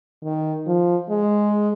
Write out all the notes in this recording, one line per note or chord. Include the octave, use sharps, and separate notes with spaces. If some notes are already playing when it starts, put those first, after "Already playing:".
D#3
F3
G#3